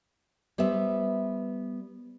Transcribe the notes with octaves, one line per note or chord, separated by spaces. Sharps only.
G3 B3 C5 E5